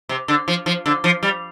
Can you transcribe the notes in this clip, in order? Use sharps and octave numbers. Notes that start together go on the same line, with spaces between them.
C3
D3
F3
F3
D3
F3
G3